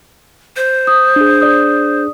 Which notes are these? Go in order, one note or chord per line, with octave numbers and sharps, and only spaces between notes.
C5
D#6
D4 G#4
D5 D#6